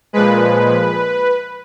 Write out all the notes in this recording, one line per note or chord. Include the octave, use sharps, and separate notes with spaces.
A#2 F3 G#3 B4